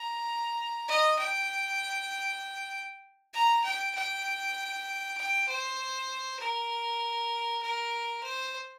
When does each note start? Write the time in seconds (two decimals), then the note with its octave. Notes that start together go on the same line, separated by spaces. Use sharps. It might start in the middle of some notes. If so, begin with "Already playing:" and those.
Already playing: A#5
0.88 D#5
1.18 G5
3.33 A#5
3.64 G5
3.95 G5
5.17 G5
5.48 C5
6.39 A#4
7.62 A#4
8.23 C5